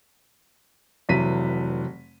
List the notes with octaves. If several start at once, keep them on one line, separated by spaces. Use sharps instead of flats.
F1 E3 F#3 B6 D#7